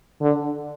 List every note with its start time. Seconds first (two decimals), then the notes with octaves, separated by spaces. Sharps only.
0.22 D3